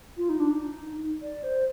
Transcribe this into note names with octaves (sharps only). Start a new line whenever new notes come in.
F4
D#4
D4
D#4
D5
C5